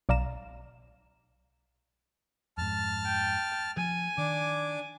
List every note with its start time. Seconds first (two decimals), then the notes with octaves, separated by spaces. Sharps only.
0.09 B1 D5 F5 A#5 E7
2.58 F2 G#2 A5 F6
3.05 G5
3.77 F3 G#5
4.18 D#3 D4 D6